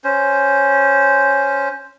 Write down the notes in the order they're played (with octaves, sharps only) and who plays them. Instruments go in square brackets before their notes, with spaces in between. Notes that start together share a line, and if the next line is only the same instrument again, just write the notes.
[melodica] C#4 C5